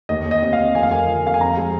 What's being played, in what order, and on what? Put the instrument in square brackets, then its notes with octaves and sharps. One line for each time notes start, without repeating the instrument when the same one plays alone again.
[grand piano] D#2 D#5
D#2
D#5
C4 D#5
F5
C4
F2 G#5
F5
A#3 G#5
F3
F2 F5
G#5
C4 A#5
G#3